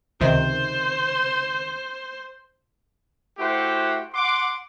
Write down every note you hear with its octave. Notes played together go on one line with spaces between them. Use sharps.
C#2 C3 D#3 C5
A3 E4 F#4 G4 C5 F#5
F#5 C6 D6